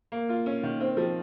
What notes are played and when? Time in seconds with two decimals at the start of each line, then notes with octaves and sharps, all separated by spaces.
0.12 A#3
0.29 F4
0.46 C#4
0.63 D#3
0.80 C4
0.97 F3